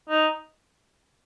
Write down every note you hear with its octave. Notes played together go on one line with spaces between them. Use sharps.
D#4